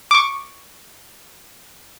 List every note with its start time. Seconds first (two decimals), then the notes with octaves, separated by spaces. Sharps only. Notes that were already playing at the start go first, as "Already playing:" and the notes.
0.11 C#6 D6